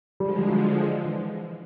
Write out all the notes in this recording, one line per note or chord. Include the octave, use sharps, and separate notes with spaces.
D3 F3 G3 G#3
G3
F#3
E3